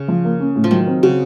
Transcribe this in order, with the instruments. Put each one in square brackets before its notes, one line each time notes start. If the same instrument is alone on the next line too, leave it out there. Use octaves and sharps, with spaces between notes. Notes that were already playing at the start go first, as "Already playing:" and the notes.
Already playing: [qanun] C#3
[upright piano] F3
A#3
C#4
A2
[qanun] F3
[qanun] D#3 [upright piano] F#3
[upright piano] C4
[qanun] C#3 [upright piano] F#4